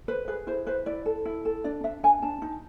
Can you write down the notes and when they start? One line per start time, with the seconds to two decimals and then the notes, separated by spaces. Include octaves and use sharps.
0.08 B4 C5
0.28 G#4 B4
0.47 E4 C5
0.67 B4 C5
0.86 E4 D5
1.06 A4
1.25 E4
1.45 A4
1.64 D4 D5
1.84 D4 E5
2.03 D4 G#5
2.22 D4 A5
2.42 D#4